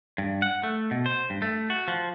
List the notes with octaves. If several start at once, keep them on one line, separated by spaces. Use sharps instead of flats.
G2
F#5
A3
B2
C5
G2
A3
F#4
F3